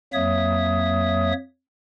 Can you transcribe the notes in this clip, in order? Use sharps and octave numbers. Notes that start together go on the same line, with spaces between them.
F2 F#3 A#3 C#5 E5 D#6